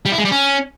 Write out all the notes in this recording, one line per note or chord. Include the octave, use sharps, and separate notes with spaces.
G3
E4
G#3
G3
C#4